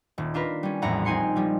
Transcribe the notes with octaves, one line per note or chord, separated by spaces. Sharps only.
D#1
D4 F4 A#4 B4
G3 C#4
A#1 E2 A2 F#5 A#5
C4 D#4 G#5 C6 C#7
F3 G3 G#3